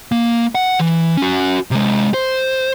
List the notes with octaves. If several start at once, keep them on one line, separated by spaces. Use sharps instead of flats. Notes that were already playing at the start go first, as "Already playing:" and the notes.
A#3
F#5
E3
C#4 F#4
C3 G#3
C5